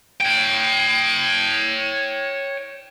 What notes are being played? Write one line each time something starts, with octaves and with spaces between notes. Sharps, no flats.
C#5 G5